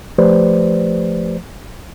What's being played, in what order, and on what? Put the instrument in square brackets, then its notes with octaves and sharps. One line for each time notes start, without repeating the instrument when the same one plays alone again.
[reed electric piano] F3 A3 G4 B4 C5 D5